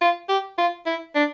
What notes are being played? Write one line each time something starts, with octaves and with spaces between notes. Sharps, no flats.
F4
G4
F4
E4
D4